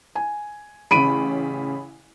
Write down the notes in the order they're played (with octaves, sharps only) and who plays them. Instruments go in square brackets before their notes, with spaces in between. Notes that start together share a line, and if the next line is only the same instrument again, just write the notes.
[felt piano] G#5
[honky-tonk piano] A1 C#3 [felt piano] B5 D7 D#7